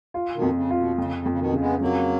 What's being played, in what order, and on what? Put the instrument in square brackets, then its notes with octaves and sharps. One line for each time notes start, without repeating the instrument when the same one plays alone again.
[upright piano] F4
[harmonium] B2 D#3
[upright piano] F2
[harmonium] C#3
[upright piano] F4
[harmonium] B2
[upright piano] F2 [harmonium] C#3
[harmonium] C#3
[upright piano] F2
[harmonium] C#3
B2 D#3
[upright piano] C#3
[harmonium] G#3 B3
[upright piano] F2 [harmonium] F#3 A#3